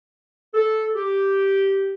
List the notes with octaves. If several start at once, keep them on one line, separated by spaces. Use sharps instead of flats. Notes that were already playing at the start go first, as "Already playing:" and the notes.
A4
G4